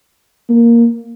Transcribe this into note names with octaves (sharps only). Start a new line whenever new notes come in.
A#3